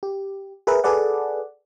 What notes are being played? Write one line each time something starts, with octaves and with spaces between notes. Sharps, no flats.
G4
G#4 A#4 B4 E5
G#4 A4 B4 D5 F#5